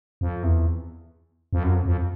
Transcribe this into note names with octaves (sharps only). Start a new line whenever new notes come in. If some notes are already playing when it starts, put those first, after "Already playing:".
F2
E2
F2
F#2
F2
F2